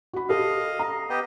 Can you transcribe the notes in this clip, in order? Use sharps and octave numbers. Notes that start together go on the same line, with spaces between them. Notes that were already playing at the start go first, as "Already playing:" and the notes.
F#4 B5
G4 A4 D#5 F5
A#5
B3 G4 D#5